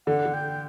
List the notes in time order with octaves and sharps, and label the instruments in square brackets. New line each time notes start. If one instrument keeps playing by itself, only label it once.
[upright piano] D3 [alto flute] F#5
[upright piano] D3
[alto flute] G5